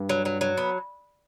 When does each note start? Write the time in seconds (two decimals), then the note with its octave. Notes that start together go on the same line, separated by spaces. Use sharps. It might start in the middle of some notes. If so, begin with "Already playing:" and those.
Already playing: G2
0.09 F#3
0.25 F#3
0.41 F#3
0.57 B3